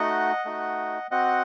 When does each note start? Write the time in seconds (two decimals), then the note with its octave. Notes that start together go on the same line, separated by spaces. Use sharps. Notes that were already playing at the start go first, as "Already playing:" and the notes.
Already playing: A3 D#4 F#4 D#5 F#5
0.45 A3 D#4 F#4
1.11 C4 F#4 D#5 F#5